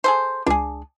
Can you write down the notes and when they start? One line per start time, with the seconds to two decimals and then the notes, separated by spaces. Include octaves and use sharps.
0.04 G#4 A4 C5
0.47 C#2 D4 G#4